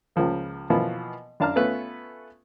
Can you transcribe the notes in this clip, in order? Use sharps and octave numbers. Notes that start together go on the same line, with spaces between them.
C#2 C#3 F3 A#3
B2 E3 F3 A#3 B3
F#2 D4 F5 A5 A#5 F6
A3 B3 C#4 F4 B4